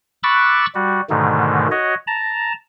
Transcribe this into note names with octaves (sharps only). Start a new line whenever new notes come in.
B5 C#6 D6 E6 F#6 A6
G3 F#4
G#2 B2 D3 D#3 A3
F#4 C#5 D#5
A5 A#5